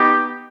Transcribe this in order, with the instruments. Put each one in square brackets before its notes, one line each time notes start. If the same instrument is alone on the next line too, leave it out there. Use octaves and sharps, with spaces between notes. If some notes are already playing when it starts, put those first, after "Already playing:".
Already playing: [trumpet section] B3 D#4 G4